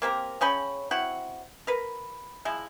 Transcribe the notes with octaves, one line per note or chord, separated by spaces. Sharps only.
A#3 C4 G4 A#4
C#3 C#4 G5 B5
C4 E4 F#4 F#5
A#4 B4
F3 G#3 E4